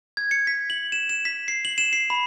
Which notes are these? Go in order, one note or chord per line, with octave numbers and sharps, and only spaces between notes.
G#6
C#7
B6
F#7
E7
E7
B6
C7
F#7
E7
C7
B5